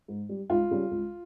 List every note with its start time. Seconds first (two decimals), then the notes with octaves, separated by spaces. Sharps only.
0.08 G#2
0.29 G3
0.50 C#2 F4
0.71 C#3 G3
0.91 C#2